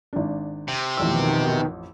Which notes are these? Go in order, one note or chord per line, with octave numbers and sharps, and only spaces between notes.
G#1 D4
C3
A1 F2 B2 D#3 E6